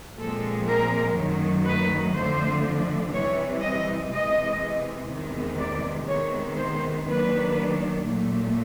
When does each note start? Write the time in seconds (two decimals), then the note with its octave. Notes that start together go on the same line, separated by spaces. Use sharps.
0.18 A#2 F3 G#3 C4 A4
0.68 A#4
1.17 F#2 D#3 F#3 A3
1.66 B4
2.15 F2 D3 F3 A3 D4 C5
3.13 C3 E3 G3 C#5
3.62 D#5
4.11 C3 E3 G#3 D#5
5.09 E2 C3 D#3 G#3 B3
5.58 D5
6.07 C3 D#3 G#3 B3 C#5
6.56 C5
7.05 D#2 D#3 F#3 A#3 D4 B4
8.04 A#2 F#3 A3